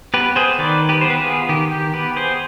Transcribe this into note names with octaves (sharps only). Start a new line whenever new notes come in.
B3 G4 B4
G#4 C5
D#3 B4 D5
G4 B4
B3 C5
B4
F4 G#4
D#3 G4
G4
B3 G4 B4
G#4 C5